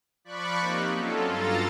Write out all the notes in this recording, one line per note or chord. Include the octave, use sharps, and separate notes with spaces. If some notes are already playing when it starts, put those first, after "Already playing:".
F3 D5 B5 C#6 F#6
A#3 C4 D#4 G4
F#3 C#4 F4 A4
G2 F4 A4 A#5 A6